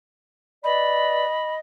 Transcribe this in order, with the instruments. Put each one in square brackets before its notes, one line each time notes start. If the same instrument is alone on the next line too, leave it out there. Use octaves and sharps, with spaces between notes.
[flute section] B4 D5 [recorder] D#5 [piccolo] B5